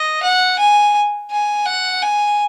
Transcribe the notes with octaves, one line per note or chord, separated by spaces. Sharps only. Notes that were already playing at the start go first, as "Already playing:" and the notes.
Already playing: D#5
F#5
G#5
G#5
F#5
G#5